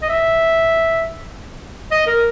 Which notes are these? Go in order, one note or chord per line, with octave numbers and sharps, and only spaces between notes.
D#5
E5
D#5
A#4